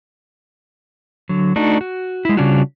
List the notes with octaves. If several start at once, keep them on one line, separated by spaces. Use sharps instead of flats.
D3 F#3
A3 D4 D#4 F#4
F#4
G#3 E4
C#3 G3 C#4 D4 F4 F#4